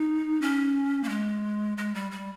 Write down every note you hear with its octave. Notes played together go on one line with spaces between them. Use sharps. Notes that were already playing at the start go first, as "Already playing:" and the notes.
Already playing: D#4
C#4
A#3
G#3
G#3
G3
G3